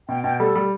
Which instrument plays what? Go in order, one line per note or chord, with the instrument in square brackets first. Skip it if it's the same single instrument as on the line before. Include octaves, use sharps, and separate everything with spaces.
[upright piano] B2 [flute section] G5
[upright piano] B2 [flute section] G5
[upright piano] G3 [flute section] A4
[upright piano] G3